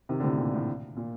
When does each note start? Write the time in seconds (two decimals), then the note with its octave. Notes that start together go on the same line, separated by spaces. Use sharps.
0.09 C3 D#3
0.20 D3
0.24 A2 C3
0.38 A#2
0.54 A2
0.96 A#2